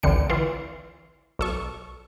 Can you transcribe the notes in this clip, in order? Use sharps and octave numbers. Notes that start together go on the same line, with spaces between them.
A1 D2 D3 C4 C#7
E3 F4
B1 A4 C#6